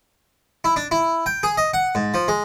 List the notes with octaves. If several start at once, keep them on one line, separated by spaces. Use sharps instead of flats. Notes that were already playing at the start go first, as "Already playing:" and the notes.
E4
D4
E4
G5
G#4
D#5
F#5
G#2
F3
G#3